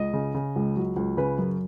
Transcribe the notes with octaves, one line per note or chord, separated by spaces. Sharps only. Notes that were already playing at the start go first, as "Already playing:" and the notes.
Already playing: C#2 D#5
C#3
C#3
C#2
F#3
C#2
C#3 B4
F#2